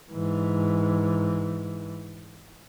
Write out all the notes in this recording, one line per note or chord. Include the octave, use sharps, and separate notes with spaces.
G#2 E3